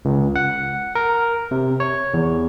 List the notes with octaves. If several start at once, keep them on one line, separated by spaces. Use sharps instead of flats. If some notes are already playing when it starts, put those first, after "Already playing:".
C#2
F#5
A#4
C3
C#5
E2